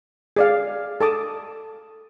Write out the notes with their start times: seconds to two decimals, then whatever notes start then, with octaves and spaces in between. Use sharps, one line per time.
0.36 G#4 D5 F5
1.01 A4 A5 D6 D#6